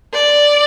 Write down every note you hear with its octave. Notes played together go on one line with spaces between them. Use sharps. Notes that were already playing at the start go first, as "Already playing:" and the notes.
D5